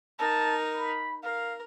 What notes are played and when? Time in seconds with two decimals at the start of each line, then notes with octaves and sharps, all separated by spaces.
0.19 D#4 A#4 A5
0.75 B5
1.23 A#4 F5